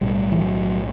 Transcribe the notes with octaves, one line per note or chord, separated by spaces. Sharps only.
B1 A2 G3
E3
F#3